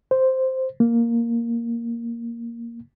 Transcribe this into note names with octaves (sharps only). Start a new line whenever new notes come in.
C5
A#3